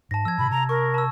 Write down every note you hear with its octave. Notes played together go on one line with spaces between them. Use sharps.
G#2 A5 A#6
F3 E6 G#6
G#2 C3 B5
C3 A#5
A#4 C#6
A5 E6